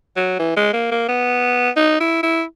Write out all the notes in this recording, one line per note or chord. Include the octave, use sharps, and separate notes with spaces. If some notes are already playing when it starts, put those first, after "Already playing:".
F#3
E3
G#3
A#3
A#3
B3
D#4
E4
E4